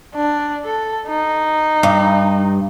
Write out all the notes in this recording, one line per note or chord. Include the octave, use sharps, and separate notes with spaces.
D4
A4
D#4
G2